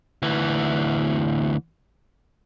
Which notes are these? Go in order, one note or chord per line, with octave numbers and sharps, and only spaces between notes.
D2 E3